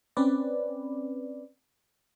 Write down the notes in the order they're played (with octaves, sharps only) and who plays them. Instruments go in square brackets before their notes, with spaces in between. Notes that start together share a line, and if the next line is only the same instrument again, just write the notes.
[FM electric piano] C4 C#4 B4 D5